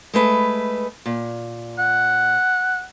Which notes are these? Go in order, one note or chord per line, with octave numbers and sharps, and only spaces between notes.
G#3 A3 B4
A#2
F#5